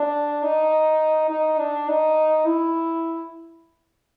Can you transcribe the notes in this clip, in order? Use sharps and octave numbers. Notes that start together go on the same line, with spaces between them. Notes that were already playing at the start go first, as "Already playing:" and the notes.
Already playing: D4
D#4
D#4
D4
D#4
E4